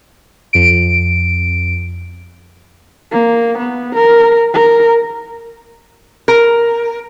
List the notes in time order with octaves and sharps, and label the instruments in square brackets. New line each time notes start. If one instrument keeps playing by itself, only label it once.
[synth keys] F2 D7
[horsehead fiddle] A#3
B3
A#4
A#4
[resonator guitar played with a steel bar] A#4